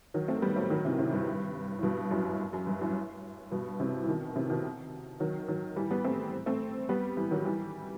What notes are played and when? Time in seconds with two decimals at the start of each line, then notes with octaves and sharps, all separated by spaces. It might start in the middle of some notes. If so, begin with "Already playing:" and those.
0.14 D#3 F#3
0.28 A3 C4
0.42 G3 B3
0.56 F#3 A3
0.70 D#3 F#3
0.85 C3 E3
0.98 A2 C3
1.13 G2
1.79 A2
1.83 G2 B2
2.11 F#2 A2
2.53 F#2
2.67 G2
2.81 F#2 A2
3.51 G2 B2
3.80 A2 C3
4.03 E3
4.08 B2 D#3
4.36 A2 C3
4.50 B2 D#3
5.20 D#3 F#3
5.48 D#3 F#3
5.76 E3 G3
5.91 G3 B3
6.05 A3 C4
6.46 A3 C4
6.89 G3 B3
7.17 E3 G3
7.31 D#3 F#3
7.45 E3 G3